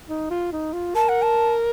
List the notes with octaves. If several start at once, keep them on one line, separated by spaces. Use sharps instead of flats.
D#4
F4
D#4
F4
A#4 A5
F#5
A5